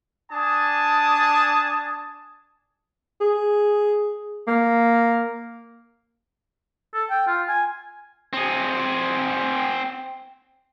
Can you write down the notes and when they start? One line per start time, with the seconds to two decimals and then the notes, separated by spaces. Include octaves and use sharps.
0.31 D4 G#5 A5 D#6
3.21 G#4
4.48 A#3
6.94 A4
7.10 G5
7.27 F4
7.49 G#5
8.33 C4 G#4